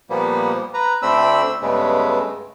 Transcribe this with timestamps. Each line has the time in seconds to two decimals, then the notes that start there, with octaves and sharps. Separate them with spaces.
0.10 A#2 F3 G3 A#3 B3
0.74 B4 A#5
1.02 D2 A3 C4 D4 B5 E6
1.62 G2 C#3 G#3 A3 B3